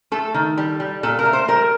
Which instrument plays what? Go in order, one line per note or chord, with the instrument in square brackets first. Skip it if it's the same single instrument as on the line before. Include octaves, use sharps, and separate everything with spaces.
[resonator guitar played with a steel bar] A3 A4
D#3
G3
G3
A#2 A4
A#4
A3
C5
G3 A#4